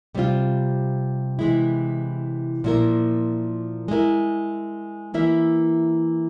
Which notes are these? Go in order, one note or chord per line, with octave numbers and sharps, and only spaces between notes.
C3 G3 C4 F4
C3 E3 G#3 E4
A#2 F3 A#3 E4 A#4
G#3 E4 A#4
E3 A#3 E4 A#4 E5